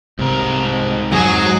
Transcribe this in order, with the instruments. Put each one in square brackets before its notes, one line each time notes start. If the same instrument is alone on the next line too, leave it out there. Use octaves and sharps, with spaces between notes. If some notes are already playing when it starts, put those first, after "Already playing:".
[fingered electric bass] C2 C3 [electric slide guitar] G#2 A#4
[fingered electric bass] F2 [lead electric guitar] F#3 [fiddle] G#4